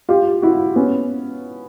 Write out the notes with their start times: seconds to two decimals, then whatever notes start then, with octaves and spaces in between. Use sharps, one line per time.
0.09 F4 G4
0.42 E4 F#4
0.76 B3 C#4